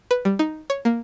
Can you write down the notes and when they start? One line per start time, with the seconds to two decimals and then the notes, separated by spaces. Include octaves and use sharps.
0.11 B4
0.25 G3
0.39 D#4
0.70 C#5
0.85 A#3